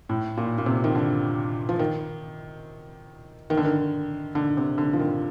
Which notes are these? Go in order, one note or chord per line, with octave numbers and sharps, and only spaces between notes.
A2
A#2
A#2
C3
D#3
D3
F3
D#3
D#3
D3
D#3
D3
C3
D3
F3
D#3